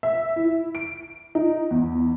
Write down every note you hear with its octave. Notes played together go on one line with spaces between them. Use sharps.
E5
E4
D7
D#4
E2